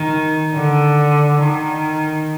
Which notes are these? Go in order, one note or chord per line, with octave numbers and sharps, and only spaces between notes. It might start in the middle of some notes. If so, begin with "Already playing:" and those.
Already playing: D#3
D3
D#3